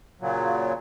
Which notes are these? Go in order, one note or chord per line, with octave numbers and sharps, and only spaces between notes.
A#2 C#3 F#3